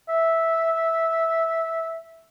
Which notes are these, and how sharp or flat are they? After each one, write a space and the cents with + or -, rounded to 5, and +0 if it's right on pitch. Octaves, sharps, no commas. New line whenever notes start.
E5 -10